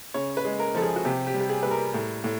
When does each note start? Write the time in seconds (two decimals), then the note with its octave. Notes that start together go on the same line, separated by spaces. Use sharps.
0.14 C#3 C#5
0.37 B4
0.45 G#3
0.59 A#4
0.75 F3 A4
0.82 G#4
0.96 F#4
1.05 C3 G4
1.27 G4
1.34 G3
1.40 G4
1.49 G#4
1.63 G3 B4
1.71 A#4
1.94 A2
2.24 A2